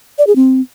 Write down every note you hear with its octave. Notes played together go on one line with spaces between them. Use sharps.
D5
G#4
C4